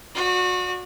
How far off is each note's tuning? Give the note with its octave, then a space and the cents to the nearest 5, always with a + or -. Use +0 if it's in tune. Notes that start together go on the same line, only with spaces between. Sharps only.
F#4 -30 D5 +0